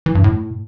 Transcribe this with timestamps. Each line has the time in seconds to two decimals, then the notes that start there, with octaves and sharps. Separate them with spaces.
0.06 E3
0.15 G2
0.24 A2